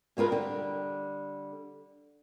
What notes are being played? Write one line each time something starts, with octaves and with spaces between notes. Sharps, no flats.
B2 G#3 F4 A#4 B4
D3 G3